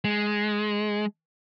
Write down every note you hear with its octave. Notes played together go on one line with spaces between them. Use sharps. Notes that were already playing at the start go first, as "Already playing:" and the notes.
G#3